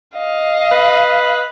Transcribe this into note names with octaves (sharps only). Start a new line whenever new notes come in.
D#5 F5
B4